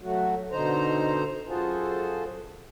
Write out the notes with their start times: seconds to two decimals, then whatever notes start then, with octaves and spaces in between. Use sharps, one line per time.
0.01 F#3 A3 F#4
0.51 B2 D3 D#4 C5 A#5
1.48 F#2 F4 F#4 G#4 A4 C5